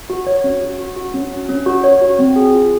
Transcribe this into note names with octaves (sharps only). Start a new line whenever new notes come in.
F#4
C#5
C#4
F#4
F#4
F#4
C#4
C#4
C#4
F#4
C#5
F#4
C4
G#4
F4